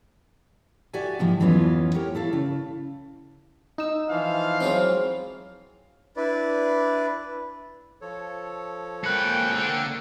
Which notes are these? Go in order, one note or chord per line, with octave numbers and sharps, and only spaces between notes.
F#4 G4 D5 E5 G#5
G#2 C3 D#3 F3 A#3 E4
F2 E3 F#3 B3 C#4 F4
G4 A#4 C#5
E4 A4 F5
C#3
D#4 E6
E3 F3 F5
F#3 G#3 C4
D4 E4 B4 D5
F3 A4 C#5
G#3 A#3 G5 B5 F#6 C#7
D3